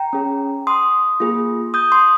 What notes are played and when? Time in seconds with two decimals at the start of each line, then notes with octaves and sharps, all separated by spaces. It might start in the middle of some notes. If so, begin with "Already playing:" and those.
Already playing: G5 A#5
0.13 C#4 G#4
0.67 C6 D#6
1.20 A#3 F4 G#4
1.74 D#6 G6
1.92 C6 D#6